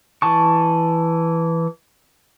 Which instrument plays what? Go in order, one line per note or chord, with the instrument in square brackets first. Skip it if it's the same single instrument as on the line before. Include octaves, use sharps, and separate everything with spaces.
[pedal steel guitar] E3 A5 C#6